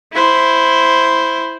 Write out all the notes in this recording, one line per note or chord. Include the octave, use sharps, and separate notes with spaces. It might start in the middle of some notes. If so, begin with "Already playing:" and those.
E4 C5